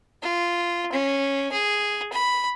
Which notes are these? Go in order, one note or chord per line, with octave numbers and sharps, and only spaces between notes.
F4
C#4
G#4
B5